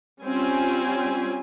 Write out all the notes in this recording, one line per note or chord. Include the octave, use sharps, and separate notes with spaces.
G3 C4 C#4 F4 G#5